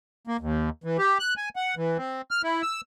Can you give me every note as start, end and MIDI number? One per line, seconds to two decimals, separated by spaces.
0.27 0.37 58
0.41 0.70 39
0.84 0.97 52
0.98 1.18 67
1.19 1.34 90
1.37 1.49 80
1.56 1.75 78
1.77 1.97 52
1.98 2.21 60
2.31 2.42 89
2.43 2.62 64
2.62 2.81 88